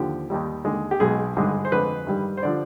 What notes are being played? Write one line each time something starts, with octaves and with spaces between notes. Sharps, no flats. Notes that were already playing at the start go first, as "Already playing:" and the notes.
Already playing: D#2 D3 F3 G4
D#2 D#3 G3
D#2 D3 G#3
G4
B1 B2 G#3 G#4
G#1 G2 D3 G#3
C5
F2 D3 G#3 B4
G2 D#3 G3
C5
D3 F3 D5